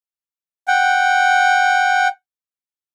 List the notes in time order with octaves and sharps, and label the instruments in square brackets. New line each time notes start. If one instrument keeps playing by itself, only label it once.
[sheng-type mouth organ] F#5 G5